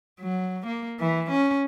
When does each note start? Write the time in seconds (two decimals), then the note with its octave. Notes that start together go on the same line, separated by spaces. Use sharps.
0.21 F#3
0.67 A#3
1.00 E3
1.31 C#4